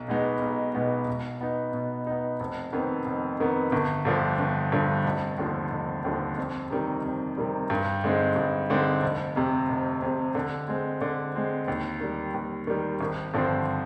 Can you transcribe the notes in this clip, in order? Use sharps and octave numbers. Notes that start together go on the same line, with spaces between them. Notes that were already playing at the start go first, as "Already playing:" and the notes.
Already playing: B1
B2 G#3 B3 D#4
B1
B2 G#3 B3 D#4
B2
B3 D#4
B2
B3 D#4
F1
F2 D#3 B3
F1
F2 D#3 B3
G1
G2 D3 F3
G1
G2 D3 F3
F1
D#2 D3 F3
F1
D#2 D3 F3
F2
C3 D#3 G3
F2
C3 D#3 G3
G2
D3 G#3 C4 D#4
G2
D3 G#3 C4 D#4
F1
F2 C3
F1
F2 C3
D3
G#3 C4
D3
G#3 C4
D#2
D#3 G3
D#2
D#3 G3
G#1
G2 D3 F3 C4